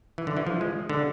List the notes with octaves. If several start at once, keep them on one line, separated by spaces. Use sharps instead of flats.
E3
D3
E3
F3
G#3
D3